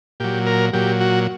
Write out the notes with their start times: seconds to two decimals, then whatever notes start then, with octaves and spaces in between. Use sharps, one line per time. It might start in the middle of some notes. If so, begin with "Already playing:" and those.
0.20 A#2 F#3 G4
0.47 A#4
0.73 A#2 F#3 G4
1.01 F#4